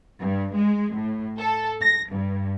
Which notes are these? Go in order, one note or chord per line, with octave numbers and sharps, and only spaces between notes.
G2
G#3
A2
A4
A#6
G2